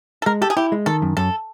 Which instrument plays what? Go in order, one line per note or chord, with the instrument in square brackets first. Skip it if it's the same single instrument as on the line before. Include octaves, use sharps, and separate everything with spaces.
[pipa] A4
[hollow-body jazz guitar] G#3 [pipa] A#4
[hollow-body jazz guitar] G4 [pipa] A4
[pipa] G#4
[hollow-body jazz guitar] E4 [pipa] G4
[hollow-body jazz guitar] G#3
[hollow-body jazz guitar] D#3 [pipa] A4
[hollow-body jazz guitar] F#2
[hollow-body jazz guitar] F#2 [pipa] A4